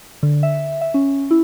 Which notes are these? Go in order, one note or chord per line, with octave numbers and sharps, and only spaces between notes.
D3
E5
E5
C#4
E4